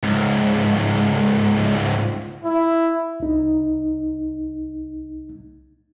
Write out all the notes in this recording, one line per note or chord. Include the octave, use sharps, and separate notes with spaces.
C#2 G#2
E4
C2 D#4